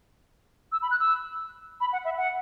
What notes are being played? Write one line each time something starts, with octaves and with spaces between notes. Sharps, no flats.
E6
B5
F#6
E6
B5
F#5
E5
F#5